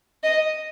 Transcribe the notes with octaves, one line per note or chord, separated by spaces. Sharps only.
D#5